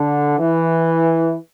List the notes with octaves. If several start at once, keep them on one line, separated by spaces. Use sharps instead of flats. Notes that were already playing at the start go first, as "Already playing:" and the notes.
Already playing: D3
E3